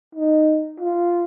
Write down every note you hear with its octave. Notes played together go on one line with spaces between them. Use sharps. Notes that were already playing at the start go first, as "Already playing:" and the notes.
D#4
F4